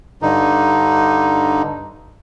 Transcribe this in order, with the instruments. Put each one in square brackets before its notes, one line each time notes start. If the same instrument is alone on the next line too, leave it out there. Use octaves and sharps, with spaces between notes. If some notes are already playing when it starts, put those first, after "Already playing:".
[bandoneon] G2 D3 D#4